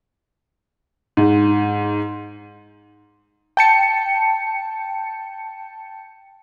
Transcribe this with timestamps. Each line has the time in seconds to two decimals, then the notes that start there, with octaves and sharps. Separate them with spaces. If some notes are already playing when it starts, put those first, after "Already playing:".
1.17 G#2
3.57 G5 A5 C#7